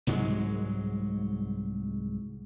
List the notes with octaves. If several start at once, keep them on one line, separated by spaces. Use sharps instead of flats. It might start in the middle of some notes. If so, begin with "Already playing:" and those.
C2 G#2 F#3 G#3